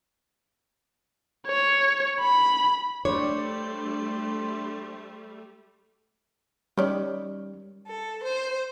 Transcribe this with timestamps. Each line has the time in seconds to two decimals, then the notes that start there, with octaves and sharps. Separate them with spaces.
1.47 C#5
2.20 B5
3.05 G3 A3 D4 C5 C#5
6.78 D#3 G3 C#4 D5
7.86 A4
8.23 C5